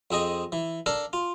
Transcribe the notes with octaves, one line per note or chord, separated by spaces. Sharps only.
F2 C4 G#4 D#5
E3
D4 A4 A#4 F5
F4